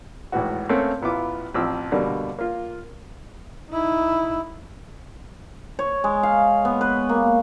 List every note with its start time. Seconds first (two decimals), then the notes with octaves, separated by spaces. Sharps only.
0.32 G#1 A2 E3 F#4
0.69 A3 A#3 C4 C#4
1.02 A1 B3 E4 F4 D6
1.54 A1 F3 C4 E6
1.92 B2 D3 G3 A#3
2.39 A#3 F4
3.71 D#4 E4
5.79 C#5
6.04 G#3
6.23 F5
6.65 B3
6.81 B4
7.09 A#3